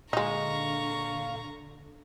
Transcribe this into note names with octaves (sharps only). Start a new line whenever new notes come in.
A#2 D3 G#3 D#4 F5 A#5 C#6